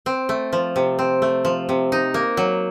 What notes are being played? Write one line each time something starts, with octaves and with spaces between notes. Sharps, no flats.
C4
A3
F3
C3
C4
A3
F3
C3
D#4
A#3
F#3